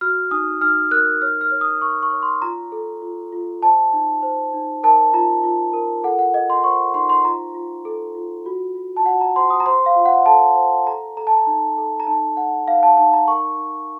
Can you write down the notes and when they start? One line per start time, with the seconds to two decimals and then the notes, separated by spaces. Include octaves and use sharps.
0.01 F#4 F6
0.31 D#4 D#6
0.61 D#4 F6
0.91 A#4 F#6
1.22 C#5 F6
1.41 F6
1.51 C#5
1.61 D#6
1.82 A#4 C#6
2.03 C#6
2.12 C#5
2.22 C6
2.42 F4 A#5
2.72 A4
3.02 F4
3.32 F4
3.62 C5 A5
3.93 D#4
4.22 C5
4.54 D#4
4.83 A#4 A5
5.13 F4 A#5
5.44 F4
5.73 A#4
6.04 A4 F#5
6.19 F#5
6.34 A4 D#5
6.50 C6
6.64 C5 C#6
6.94 D#4 C6
7.09 C6
7.25 F4 A#5
7.55 F4
7.85 A4
8.15 F4
8.46 F#4
8.75 F#4
8.96 A5
9.06 F#4 F#5
9.21 A#5
9.36 C5 C6
9.50 D#6
9.60 A#5
9.66 C5 C6
9.86 F5
9.96 F4
10.06 F#5
10.26 A4 A5
10.56 C5
10.87 A4 A#5
11.17 A4 A#5
11.27 A5
11.37 A#5
11.47 D#4
11.78 A4
12.00 A#5
12.07 D#4 A5
12.37 D#4 F#5
12.68 D#4 F5
12.83 A5
12.97 D#4 A5
13.13 A#5
13.28 A#4 C#6
13.57 D#4